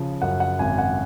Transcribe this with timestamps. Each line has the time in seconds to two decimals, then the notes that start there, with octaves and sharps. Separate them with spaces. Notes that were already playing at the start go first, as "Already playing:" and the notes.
Already playing: C#3 F3
0.22 F#2 F#5
0.40 F#5
0.59 G#1 G#5
0.78 F#5